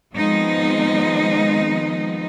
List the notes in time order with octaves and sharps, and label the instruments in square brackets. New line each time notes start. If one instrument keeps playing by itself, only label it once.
[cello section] D#3 F3 G#3 B3 C4 D#4